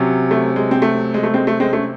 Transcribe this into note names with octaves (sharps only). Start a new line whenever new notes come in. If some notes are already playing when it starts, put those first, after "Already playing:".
Already playing: C3 F#3 C#4
A3
G#3
C4
A3
G#3
A3
G#3 C4
A3
G#3 C4
A3 C#4